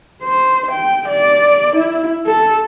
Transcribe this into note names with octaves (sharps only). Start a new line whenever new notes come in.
C5
G5
D5
E4
A4